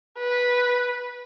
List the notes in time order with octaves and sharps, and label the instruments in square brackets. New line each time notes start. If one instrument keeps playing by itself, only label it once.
[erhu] B4